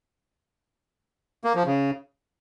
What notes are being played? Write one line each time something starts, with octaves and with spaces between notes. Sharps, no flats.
A#3
F3
C#3